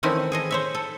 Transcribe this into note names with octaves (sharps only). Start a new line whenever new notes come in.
D#3 E3 A3 C4 C#4 E4
G#4 A4 D#5
C5 C#5 E5
A4